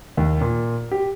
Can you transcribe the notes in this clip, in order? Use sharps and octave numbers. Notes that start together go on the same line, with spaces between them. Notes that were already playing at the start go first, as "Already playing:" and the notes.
D#2
A#2
G4